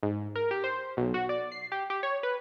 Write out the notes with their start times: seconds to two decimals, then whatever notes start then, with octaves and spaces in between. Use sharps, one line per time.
0.03 G#2
0.36 A#4
0.51 G4
0.64 C5
0.97 B1
1.14 F#4
1.29 D5
1.52 C7
1.72 G4
1.90 G4
2.03 C#5
2.23 B4